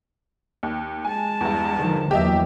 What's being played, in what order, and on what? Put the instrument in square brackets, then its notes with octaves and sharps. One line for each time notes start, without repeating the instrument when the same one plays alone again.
[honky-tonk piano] D#2
[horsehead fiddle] G#3 A5 [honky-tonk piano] G#5
[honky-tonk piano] E2 G2
[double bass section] D3 D#3 F3
[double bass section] E2 F#3 A#3 [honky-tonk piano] G4 D#5 E5